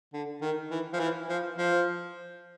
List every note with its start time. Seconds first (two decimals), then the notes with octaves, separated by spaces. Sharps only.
0.13 D3
0.42 D#3
0.71 E3
0.93 F3
1.00 E3
1.29 F3
1.58 F3